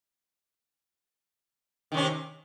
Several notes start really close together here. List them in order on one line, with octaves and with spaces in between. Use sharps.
D#3 C3 C#4